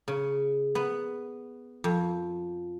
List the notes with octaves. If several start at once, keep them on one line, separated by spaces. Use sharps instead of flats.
C#3
B3
F2